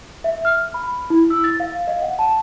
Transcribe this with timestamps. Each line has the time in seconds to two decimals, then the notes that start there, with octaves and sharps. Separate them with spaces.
0.24 E5
0.45 F6
0.74 B5
1.10 E4
1.30 E6
1.44 A6
1.60 F5
1.87 D#5
2.02 F#5
2.19 A5